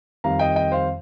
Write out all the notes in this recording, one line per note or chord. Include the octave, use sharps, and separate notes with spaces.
F2 D#3 G3 F5 A#5
D#5 G5
D#5 G5
C5 F5